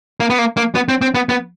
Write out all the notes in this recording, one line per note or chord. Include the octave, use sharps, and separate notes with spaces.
A#3
B3
A#3
A#3
B3
C4
C4
B3
B3